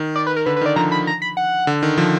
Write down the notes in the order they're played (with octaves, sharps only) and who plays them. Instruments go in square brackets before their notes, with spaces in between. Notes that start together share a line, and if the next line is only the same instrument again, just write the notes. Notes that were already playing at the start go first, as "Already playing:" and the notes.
Already playing: [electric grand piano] D#3
[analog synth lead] D5
B4
A#4
[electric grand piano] D3 [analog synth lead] B4
[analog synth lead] B4
[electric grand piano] D#3 [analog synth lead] D5
[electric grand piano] D3 F3 [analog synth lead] A#5
[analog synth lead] B5
A#5
B5
F#5
[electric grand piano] D3
D#3
D3 F3